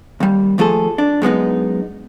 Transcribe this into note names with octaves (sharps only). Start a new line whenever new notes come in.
D#2 G3
D#2 F3 A3 G#4 A4
D4
F#2 G#3 B3 D#4